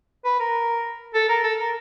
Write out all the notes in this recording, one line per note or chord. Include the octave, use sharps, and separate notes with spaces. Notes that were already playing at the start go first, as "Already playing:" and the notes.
B4
A#4
A4
A#4
A4
A#4